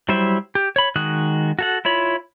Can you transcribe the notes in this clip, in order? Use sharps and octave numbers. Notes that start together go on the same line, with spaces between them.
F#3 G3 E4 C5 E5
G4
C#5 B5
D#3 G#3 F#4 D#6 F#6
F#4 A4 F#5
E4 F4 C#5 B5